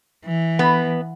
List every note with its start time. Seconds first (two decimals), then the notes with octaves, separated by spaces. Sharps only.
0.25 E3
0.59 B3